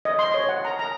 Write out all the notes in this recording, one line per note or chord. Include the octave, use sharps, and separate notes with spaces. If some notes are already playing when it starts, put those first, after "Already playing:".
D#5
C6
C#5
F#5
A#5
A#5